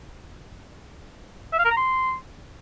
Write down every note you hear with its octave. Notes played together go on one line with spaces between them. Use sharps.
E5
F5
A#4
A#5
C6